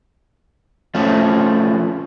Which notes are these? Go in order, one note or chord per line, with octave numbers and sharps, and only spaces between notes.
F3 A3 C#4